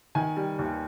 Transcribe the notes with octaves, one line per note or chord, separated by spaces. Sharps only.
D#3 G#5
G3
D#2